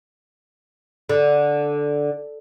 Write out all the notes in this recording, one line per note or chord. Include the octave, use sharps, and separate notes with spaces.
D3